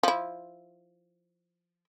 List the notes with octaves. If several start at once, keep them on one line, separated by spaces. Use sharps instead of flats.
F3 E4